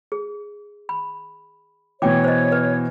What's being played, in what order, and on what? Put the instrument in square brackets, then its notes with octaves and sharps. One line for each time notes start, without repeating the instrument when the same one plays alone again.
[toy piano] G#4
B5
[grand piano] B2 E3 [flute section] C#5 [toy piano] G5 D6
[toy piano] C5 D#5
B4